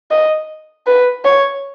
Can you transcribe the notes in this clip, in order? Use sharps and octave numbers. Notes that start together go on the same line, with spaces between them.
D#5
B4
C#5